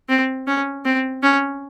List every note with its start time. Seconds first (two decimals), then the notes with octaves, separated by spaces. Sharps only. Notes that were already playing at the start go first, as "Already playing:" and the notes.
0.09 C4
0.47 C#4
0.85 C4
1.23 C#4